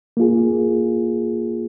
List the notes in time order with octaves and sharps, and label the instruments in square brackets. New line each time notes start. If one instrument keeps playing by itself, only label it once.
[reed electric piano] A#3 F4 G#4